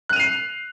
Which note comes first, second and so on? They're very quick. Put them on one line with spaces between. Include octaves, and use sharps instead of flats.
F#6 D#7 F7 C7